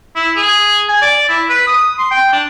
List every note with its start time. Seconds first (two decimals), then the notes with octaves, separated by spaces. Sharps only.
0.16 E4
0.36 G#4
0.89 G#5
1.02 D5
1.29 E4
1.49 B4
1.67 D#6
1.98 C6
2.11 G5
2.33 D4